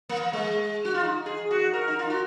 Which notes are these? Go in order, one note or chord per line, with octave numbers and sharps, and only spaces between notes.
A#3
G#3
F#4
F4
D#4
G#4
F#4
A#4
D#4
F4
F#4